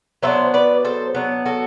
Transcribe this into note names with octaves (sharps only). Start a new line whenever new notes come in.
F#3 B3 D4 C5 E5
B4 D5
A4 C5
F#3 B3 D4
F#4 A4